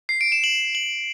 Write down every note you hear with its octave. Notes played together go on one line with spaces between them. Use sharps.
C7
D7
E7
F#7
F#7